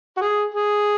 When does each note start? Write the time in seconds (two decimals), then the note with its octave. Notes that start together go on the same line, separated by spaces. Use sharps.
0.17 F#4
0.21 G#4
0.54 G#4